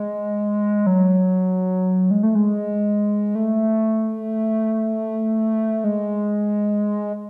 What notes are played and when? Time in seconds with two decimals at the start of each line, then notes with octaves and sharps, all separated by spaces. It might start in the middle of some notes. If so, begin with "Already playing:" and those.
Already playing: G#3
0.87 F#3
2.11 G#3
2.23 A3
2.35 G#3
3.35 A3
5.84 G#3